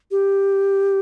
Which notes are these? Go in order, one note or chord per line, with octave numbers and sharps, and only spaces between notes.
G4